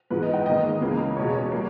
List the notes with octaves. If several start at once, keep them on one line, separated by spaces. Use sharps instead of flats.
G#2 E3 G#3 B4
D#5
G5
G#2 D#3 A#3 D#5
C#2 C#3 E3 A#3
E2 B2 G#3 C#5
G3 A#3